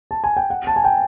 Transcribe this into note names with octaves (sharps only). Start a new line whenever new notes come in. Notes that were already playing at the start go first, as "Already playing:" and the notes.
A5
G#5
G5
F#5
A5
G#5
G5